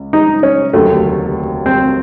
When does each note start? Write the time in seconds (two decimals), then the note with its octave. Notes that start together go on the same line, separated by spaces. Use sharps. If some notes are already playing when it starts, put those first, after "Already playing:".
Already playing: C#2
0.13 D#4
0.43 C#4
0.73 F1 D#2 D3 F#3 A3
1.66 C4